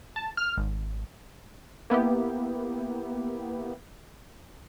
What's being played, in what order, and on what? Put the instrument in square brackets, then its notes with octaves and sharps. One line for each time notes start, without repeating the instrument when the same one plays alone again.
[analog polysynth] A5
F6
G#1
A#3 B3 E4 G4